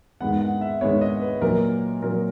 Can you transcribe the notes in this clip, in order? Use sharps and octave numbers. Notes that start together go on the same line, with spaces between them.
G#2 D#3 G#3 B3 F#5
F#5
E5
G#2 D#3 G#3 B3 C#5
D#5
B4
A#2 F#3 A#3 A#4
A#2 F#3 A#3 A#4